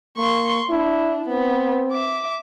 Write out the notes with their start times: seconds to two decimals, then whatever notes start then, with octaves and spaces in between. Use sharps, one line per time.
0.17 A#3 C6 C#6
0.69 D4 E4
1.28 B3 C4
1.92 E5 D6